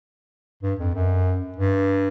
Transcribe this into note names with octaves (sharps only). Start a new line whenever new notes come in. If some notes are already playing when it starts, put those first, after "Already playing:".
G2
F2
F#2
G2